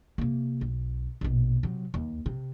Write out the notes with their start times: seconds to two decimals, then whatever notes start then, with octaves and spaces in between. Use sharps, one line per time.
0.18 C3 A#3
0.61 B1
1.21 A#1 B2
1.63 C3 F#3
1.94 D#2
2.26 C3